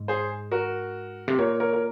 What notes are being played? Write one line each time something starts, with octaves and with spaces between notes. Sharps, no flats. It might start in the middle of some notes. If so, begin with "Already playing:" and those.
Already playing: G#2
G#4 C5
F#4 A#4
C3
A#2 A#4 C#5
A#4 C#5
A#4